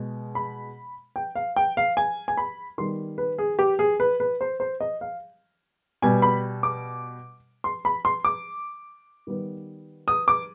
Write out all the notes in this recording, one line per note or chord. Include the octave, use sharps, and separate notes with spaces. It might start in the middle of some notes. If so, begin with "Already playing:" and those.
Already playing: B2 G#3
B5
G5
F5
G5
F5
G#5
G#5
B5
D#3 G3 B3 C6
B4
G#4
G4
G#4
B4
B4
C5
C5
D#5
F5
B2 G3 B3 G#5
B5
D6
C6
B5
C6
D6
D#3 G3 B3
D#6
D6